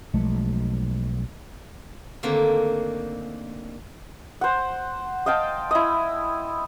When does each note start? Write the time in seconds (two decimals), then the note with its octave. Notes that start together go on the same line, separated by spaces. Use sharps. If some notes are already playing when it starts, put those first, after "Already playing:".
0.14 B1 F3 G#3 A3
2.23 D3 D#3 A3 A#3 C4
4.41 C5 F#5
5.26 D#5 F5 G5 A5
5.71 E4 D#5